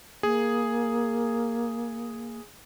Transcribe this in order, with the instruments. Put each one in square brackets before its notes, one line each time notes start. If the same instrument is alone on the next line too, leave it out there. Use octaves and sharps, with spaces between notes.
[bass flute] A#3 [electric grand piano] G#4